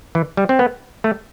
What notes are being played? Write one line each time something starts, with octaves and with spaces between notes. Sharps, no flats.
E3
G3
C4
B3
A3